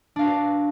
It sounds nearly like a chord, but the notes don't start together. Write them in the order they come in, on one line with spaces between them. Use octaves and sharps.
D4 F5 F#4 B4 D5